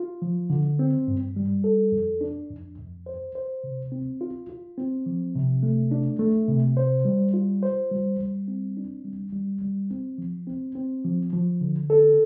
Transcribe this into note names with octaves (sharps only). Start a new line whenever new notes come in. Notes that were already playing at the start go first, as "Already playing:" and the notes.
Already playing: F4
F3
D3
C4
G2
G3
A4
F2
D4
F2
F2
C5
C5
C3
C4
F4
F4
C4
F3
C3
A3
D4
A3
C3
C5
G3
F4
C5
G3
G3
C4
D4
G3
G3
G3
C4
F3
C4
C4
F3
F3
D3
A4